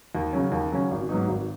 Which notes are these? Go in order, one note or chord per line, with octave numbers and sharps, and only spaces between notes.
D#2
C#3 F#3 C#4
D#2
C#3 F#3 C#4
G#1
G#2 F#3 B3 D#4
G#1